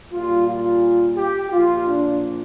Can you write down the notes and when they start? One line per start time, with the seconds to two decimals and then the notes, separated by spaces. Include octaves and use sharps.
0.13 A#2 G3 F4
0.47 F4
1.17 G4
1.52 A#2 F3 F4
1.87 D4